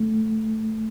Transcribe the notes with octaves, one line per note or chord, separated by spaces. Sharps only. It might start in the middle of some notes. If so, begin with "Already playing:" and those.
Already playing: A3